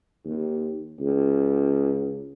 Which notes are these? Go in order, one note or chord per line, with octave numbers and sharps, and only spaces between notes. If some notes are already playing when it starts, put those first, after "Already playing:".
D#2
C#2